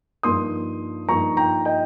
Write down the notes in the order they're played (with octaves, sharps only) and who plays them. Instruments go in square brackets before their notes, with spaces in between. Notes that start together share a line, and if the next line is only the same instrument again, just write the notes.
[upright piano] G2 F3 A#3 D#4 C6 D#6
G2 F3 A#3 D#4 A#5 C#6
G5 A#5
D#5 G5